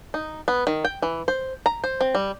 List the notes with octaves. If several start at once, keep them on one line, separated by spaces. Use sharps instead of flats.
D#4
B3
D#3
G5
E3
C5
A#5
C5
C4
G3